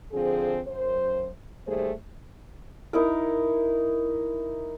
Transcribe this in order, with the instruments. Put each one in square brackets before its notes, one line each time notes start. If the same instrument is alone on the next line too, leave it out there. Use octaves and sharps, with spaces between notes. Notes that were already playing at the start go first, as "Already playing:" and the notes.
[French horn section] D3 F3 C4 G#4
F#2 C5
D#2 G3 A3 G#4 C5
[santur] D#4 E4 A#4